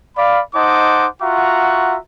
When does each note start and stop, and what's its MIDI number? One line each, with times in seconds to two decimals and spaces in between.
0.16 0.40 74
0.16 0.40 77
0.16 0.40 83
0.54 1.06 63
0.54 1.06 72
0.54 1.06 75
0.54 1.06 78
0.54 1.06 81
0.54 1.06 86
1.21 1.96 65
1.21 1.96 66
1.21 1.96 76
1.21 1.96 78
1.21 1.96 82
1.21 1.96 85